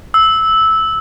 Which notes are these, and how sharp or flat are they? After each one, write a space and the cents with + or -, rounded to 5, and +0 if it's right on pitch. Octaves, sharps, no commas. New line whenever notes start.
E6 -10